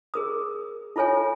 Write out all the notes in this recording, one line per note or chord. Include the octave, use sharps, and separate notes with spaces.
G#4 A#4 D#6
E4 F4 A4 C#5 G#5